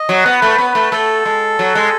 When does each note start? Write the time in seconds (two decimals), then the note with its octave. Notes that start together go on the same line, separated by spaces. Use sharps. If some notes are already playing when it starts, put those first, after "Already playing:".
Already playing: D#5
0.09 F#3
0.26 B3
0.42 A3
0.48 B4
0.58 B3
0.70 A3 B4
0.92 A3 A4
1.25 G#3
1.59 F#3
1.75 G#3